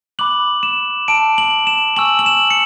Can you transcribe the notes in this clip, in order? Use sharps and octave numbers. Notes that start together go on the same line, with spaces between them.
B5 D6 F#6 F#7
E7
A5 E6 D7
F#7
E7
G#5 C#6 E6 F#7
F#7
E7
C#7